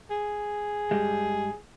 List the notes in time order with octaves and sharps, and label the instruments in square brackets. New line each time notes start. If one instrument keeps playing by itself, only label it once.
[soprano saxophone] G#4
[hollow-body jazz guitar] G2 G3 G#3